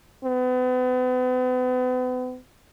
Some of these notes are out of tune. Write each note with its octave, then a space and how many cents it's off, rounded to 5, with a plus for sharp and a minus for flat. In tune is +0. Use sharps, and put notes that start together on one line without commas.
B3 +40